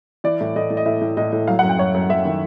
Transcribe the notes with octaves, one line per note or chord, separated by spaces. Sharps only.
E3 D5
A2
A2 D#5
A2
D#5
A2 E5
A2
A2 D#5
A2
F#3 F5
F#5
F#2
G5
F#2 C#5
F#2
F#2 E5
D#3